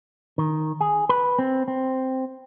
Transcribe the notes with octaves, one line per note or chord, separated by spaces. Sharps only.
D#3
G#4
B4
C4
C4